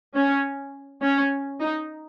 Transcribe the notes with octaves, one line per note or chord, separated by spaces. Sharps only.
C#4
C#4
D#4